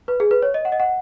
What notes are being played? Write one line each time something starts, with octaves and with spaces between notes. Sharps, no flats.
B4
G#4
B4
C#5
D#5
F#5
D#5
F#5